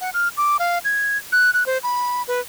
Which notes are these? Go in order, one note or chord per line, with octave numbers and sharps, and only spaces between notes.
F#5
F6
D6
F5
G#6
F#6
F#6
C5
B5
B4